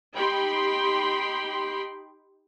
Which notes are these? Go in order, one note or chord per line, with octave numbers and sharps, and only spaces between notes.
D#4 G4 G5 B5 C6